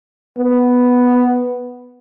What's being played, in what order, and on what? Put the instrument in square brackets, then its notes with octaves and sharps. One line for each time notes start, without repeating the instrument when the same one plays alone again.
[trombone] B3